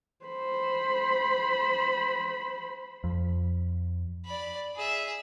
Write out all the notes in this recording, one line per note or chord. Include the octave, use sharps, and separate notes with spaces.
C5 B5
F2
D5 B5
G#4 E5